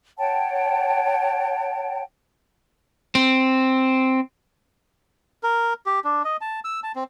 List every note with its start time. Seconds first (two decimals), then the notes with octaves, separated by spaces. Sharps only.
0.19 C#5 F#5 G5 A5
3.15 C4
5.43 A#4
5.86 G4
6.04 D4
6.25 D#5
6.41 A5
6.64 E6
6.83 A5
6.96 C4